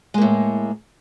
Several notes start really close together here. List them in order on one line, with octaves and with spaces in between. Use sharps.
G#3 A#3 A2